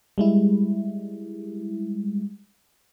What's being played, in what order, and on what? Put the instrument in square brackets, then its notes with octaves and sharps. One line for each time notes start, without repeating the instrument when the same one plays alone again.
[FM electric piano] G3 G#3 E4